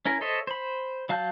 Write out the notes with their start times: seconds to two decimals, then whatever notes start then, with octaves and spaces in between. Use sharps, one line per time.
0.05 C#4 E4 A#4
0.21 A4 C5 C#5 D#5 E5
0.47 C5 B5
1.09 F#3 F5 A5 F#6 G6